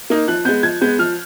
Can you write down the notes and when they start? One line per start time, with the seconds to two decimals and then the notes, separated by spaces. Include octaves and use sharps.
0.10 A#3 D#4
0.28 F3 F#6
0.45 B3 G6
0.49 G#3
0.63 F3 G#6
0.81 G#3 B3 G6
0.99 F3 F6